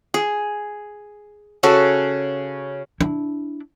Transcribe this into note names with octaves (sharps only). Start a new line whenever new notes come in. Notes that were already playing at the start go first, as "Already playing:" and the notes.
G#4
C#3 F#4 A4
D4 E4